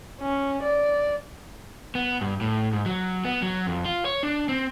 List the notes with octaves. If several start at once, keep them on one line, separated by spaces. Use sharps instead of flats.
C#4
D5
B3
G2
A2
G#2
F#3
B3
F#3
F2
F4
C#5
D4
C4